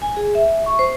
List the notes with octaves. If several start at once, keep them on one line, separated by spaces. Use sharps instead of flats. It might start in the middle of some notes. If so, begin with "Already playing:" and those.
G#5
G#4
E5
C#6
C5